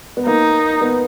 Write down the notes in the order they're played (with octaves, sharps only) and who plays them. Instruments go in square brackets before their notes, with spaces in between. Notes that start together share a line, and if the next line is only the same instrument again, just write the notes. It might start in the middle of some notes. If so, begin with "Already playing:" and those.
[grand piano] B3
[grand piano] A#3 [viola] D#4
[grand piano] B3